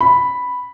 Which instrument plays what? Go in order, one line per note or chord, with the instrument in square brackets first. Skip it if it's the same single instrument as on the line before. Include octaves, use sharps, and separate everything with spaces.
[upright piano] B5